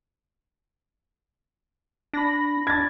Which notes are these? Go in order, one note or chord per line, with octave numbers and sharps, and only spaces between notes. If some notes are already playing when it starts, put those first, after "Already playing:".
D4 B5 A#6
D4 G#6 A6